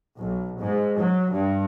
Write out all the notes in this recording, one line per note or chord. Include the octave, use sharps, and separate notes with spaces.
B1
G#2
F#3
G2